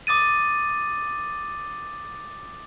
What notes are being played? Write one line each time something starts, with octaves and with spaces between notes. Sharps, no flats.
D6 D#6 A6 D#7